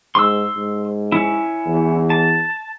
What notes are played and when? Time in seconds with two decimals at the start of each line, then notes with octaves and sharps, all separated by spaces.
0.15 G#2 C6 E6
0.56 G#2
1.12 C#4 E4
1.66 E2
2.10 A5